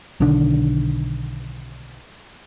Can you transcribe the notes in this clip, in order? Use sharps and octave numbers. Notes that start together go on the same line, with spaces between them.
B1 D3 D#3 D4